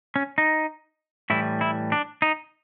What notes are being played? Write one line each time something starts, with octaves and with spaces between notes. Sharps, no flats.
C#4
D#4
A2 E3 G3 E4
E4
D4
D#4